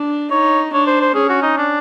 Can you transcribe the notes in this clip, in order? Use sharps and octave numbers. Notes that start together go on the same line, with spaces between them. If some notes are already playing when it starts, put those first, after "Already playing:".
Already playing: D4
D#4 C#5
D4 C#5
C5
C5
C#4 G#4
F#4
D#4
D4